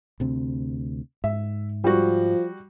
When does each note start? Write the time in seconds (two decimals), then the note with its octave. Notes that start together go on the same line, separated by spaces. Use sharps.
0.20 D2 C3 C4
1.24 G#2 E5
1.84 F3 G3 F#4